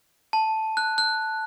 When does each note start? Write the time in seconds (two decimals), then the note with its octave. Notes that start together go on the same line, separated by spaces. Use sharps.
0.33 A5
0.77 F#6
0.98 F#6